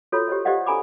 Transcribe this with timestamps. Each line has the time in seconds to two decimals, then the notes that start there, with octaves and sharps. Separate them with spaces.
0.12 F4 F#4 A4 C#5
0.28 G4 C5 C#5 D#5
0.45 G4 C5 D5 D#5 F5 F#5
0.66 D4 A4 G#5 A#5 B5 D6